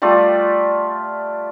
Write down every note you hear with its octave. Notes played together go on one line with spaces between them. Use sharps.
G3 A3 F4 D5